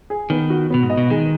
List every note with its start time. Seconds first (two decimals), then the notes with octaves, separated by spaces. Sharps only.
0.10 G#4
0.30 D#3 B3
0.50 F#4
0.70 B2 B3
0.83 G#2
0.90 D#5
0.97 B2
1.10 D#3 G#3